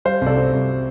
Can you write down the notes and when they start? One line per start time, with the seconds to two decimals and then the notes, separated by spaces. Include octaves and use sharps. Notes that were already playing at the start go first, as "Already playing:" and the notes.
0.05 G3 C5 F5
0.22 C2 A4 D5
0.37 C4
0.53 C2